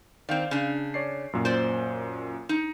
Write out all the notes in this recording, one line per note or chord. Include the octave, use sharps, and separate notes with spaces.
D#3 C4 D5 F5 G6
C#3 D4
C#5 D5 C7
F#2 A#2
C5 D5
D#4